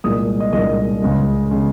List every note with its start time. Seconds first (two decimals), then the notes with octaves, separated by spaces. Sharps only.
0.04 C2 A#2 G#3 D#6
0.40 D#5
0.53 C2 A#2 G#3 D#5
1.02 C#2 C#3 G#3
1.51 C#3 G#3